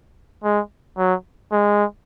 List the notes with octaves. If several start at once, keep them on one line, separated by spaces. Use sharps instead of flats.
G#3
F#3
G#3